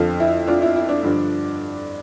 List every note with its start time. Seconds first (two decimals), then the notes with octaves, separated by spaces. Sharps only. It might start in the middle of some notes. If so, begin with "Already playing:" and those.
Already playing: F2 D3 F3 F4 A4
0.20 E4
0.47 D4 F4
0.62 E4
0.76 E4
0.89 D4
1.03 G2 D3 F3